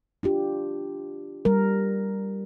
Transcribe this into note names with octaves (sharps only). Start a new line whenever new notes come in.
D4 F4 G4
G3 A#4